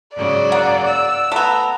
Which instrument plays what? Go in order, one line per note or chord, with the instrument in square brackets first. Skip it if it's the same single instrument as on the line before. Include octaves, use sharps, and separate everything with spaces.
[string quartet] G#2 C#3 F#3 [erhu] D5
[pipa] A#3 [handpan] F#5
[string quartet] E6
[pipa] A3 B3 [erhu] A#5